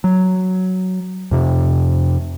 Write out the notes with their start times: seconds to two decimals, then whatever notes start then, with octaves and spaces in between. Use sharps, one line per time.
0.04 F#3
1.31 F2 C3